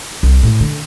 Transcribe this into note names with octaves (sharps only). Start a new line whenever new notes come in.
C2
A2
D3